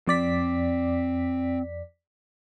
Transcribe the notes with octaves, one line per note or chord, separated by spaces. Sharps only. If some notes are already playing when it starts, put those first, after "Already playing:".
F2 C4 D5 B6